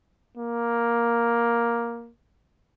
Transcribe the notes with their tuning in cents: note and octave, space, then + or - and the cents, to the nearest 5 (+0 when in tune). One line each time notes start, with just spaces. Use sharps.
A#3 +5